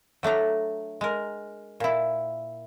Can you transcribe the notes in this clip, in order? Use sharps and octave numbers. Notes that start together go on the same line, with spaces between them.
F#3 A3 D4 A#5
G#3 A#4
A#2 E4